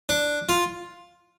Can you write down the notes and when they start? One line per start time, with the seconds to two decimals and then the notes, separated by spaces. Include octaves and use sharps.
0.09 D4
0.49 F4